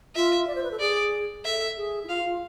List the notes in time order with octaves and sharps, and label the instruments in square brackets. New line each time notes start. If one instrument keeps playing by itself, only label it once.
[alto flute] F4 [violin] E5
[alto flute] D5
C5
B4
A4
[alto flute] G#4 [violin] D5
[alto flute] A4 [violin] E5
[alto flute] G#4
E4
[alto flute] F4 [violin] F5
[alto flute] F4